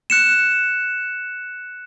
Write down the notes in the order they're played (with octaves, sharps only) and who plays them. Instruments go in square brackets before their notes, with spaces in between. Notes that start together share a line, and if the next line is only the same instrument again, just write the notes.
[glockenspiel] F#6 C#7 E7